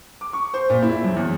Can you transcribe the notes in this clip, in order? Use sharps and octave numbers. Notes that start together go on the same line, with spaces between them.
D6
C#6
C5
A#2
E4
F#2
E2